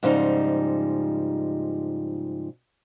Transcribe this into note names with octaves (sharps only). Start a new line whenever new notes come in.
G#2 C#3 F3 G3 C#4 D#4